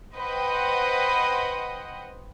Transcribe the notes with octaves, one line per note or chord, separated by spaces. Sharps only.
B4 C5 D#5 F#5 G5